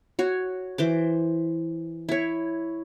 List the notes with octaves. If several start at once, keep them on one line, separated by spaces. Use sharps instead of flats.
F#4 C#5
E3 C5 D6
E4 C#5